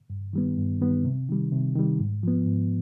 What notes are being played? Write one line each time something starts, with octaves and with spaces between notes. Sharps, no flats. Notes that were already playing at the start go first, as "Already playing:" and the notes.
G2
D#3 G3 B3
G2
D#3 G3 B3
C3
D#3 G3
C3
D#3 G3
G#2
F3 B3
G#2